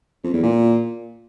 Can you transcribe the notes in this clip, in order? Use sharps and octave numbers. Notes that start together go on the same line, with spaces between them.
F2
E2
A#2